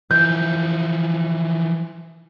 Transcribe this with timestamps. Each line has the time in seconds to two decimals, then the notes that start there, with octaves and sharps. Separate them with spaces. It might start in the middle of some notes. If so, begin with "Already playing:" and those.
0.11 E3 F3 G6